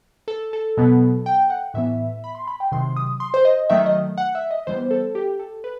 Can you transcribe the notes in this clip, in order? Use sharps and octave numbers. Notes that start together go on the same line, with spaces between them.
A4
A4
B2 F#3 B3
G5
F#5
A2 E3 B3 E5
B5
C6
B5
G5
C3 D#3 F#3 C6
D#6
C6
C5
D#5
D#3 F#3 A3 E5
D#5
F#5
E5
D#5
E3 G3 B3 C5
A4
G4
A4
B4